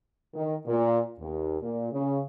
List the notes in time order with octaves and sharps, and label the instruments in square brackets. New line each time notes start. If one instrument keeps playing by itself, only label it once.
[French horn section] D#3
A#2
D#2
A#2
C#3